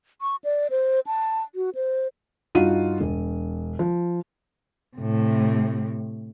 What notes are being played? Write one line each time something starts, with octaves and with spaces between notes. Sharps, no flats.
C#6
D5
C5
A5
F#4
C5
G2 D#4 F4 F#4 D#7
E1
F3
A2 C3